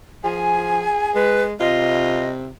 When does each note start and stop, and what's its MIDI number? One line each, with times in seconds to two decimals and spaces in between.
0.24 0.86 53
0.24 1.50 68
0.24 1.14 80
1.15 1.54 56
1.15 1.43 71
1.60 2.49 48
1.60 2.26 65
1.60 2.29 75